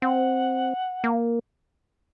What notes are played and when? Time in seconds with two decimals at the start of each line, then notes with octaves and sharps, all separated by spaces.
0.02 C4 F#5
1.04 A#3